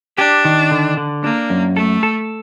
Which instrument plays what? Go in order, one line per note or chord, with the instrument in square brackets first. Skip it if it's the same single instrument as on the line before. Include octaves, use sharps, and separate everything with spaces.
[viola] D4 [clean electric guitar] G4
[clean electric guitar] D#3
D3
D3
[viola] A#3 [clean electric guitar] D4
[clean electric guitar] F#2
[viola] A3 [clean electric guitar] A4
[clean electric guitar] A4